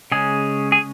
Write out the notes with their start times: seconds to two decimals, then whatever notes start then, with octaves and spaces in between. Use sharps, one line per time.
0.12 C#3 G#3 C#4 G#4
0.72 G#4